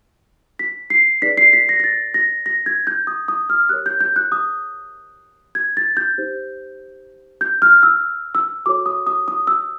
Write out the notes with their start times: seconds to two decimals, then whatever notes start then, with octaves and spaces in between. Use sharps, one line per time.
0.59 B6
0.90 C7
1.22 D#4 G#4 B4 D5 B6
1.37 C7
1.53 B6
1.69 A#6
1.80 A#6
1.84 A6
2.14 A#6
2.46 A#6
2.66 G#6
2.87 G6
3.07 D#6
3.28 D#6
3.50 F6
3.69 G4 A#4 C#5 F#6
3.86 G6
4.00 G6
4.16 F#6
4.32 D#6
5.55 G#6
5.77 A6
5.97 G6
6.18 D#4 G4 C5
7.41 G6
7.62 F6
7.83 E6
8.35 E6
8.66 F#4 A4 C#5 D6
8.86 D#6
9.07 D#6
9.28 D#6
9.47 E6